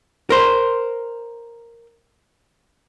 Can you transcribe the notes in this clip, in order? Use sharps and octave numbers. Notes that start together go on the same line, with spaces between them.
A#4 C5